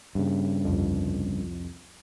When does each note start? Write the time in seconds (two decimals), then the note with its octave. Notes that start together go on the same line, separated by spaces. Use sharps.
0.15 G2 C#3
0.65 C2 F2